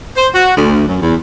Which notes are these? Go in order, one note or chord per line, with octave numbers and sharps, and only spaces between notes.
C5
F#4
D2
F#2
E2